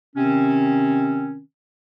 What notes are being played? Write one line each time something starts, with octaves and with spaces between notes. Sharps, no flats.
C3 D#3 C4 C#4